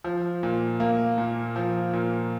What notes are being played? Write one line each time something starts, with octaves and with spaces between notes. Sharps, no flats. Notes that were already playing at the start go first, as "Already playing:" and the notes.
F3
A#2
A#3
A#2
F3
A#2